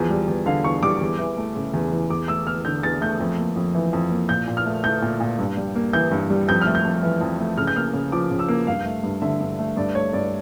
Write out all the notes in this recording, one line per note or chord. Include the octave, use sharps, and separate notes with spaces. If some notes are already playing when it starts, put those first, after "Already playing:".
Already playing: E2 F3
G3
E2
D3 F5
E2 C#6
G3 D6
E2
E3
A3
C#3
E2
E3
E2 D6
A3 E6
E2 F6
D3 G6
E2 A6
A3 G6
F2
A#3
F2
E3
F2
A#3
A#2 G6
A#2
F6
A3
A3 G6
A#2
A#2
G2
G3
A#3
E3 G6
G2
G3
F2 G6
A3 F6
G6
F2
E3
F2
A3
C#3 F6
G6
A#3 F6
C#3
F3 D6
C#3
E6
A#3
G2 F5
A3
G2
D3 E5
G2
A3
G2 D5
A3 C#5
G2 D5